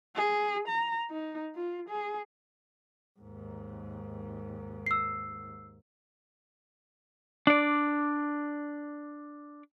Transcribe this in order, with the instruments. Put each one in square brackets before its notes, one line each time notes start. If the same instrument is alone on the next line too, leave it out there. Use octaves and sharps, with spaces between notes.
[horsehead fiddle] G#4
A#5
D#4
F4
G#4
[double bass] D#2 G#2
[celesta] E6 C7
[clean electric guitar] D4 D5